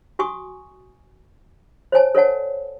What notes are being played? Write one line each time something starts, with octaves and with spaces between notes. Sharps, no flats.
F#4 G#5 C#6 D#6
C5 C#5 G#5 A5
A4 C#5 D5 F#5 A5